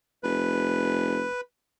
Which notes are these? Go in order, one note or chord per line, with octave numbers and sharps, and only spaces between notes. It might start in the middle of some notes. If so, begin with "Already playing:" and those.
F1 B4